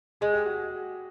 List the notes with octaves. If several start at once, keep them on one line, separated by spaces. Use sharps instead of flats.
G#3 G#4
G4
F#4